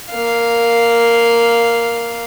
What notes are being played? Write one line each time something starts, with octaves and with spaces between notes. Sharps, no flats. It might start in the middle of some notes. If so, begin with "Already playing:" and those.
A#3 F5